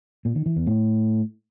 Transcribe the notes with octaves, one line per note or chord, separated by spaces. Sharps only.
A#2
D#3
E3
E2
A2